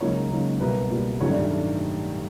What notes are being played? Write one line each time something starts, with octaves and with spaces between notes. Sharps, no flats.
C#2 C#3 F#3 A#3 C#4 D#4 C#5
C#2 C#3 F#3 A#3 D#4
C2 B2 G3 A#3 B4
C2 B2 G3 A#3
A1 G2 D#3 F#3 A3 C#4 C#5
D4 D5